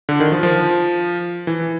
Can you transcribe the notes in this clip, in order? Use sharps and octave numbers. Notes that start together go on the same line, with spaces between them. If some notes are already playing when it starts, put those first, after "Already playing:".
D3
D#3
F3
F3
E3